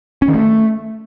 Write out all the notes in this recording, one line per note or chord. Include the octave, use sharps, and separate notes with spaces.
C#4
D#3
A3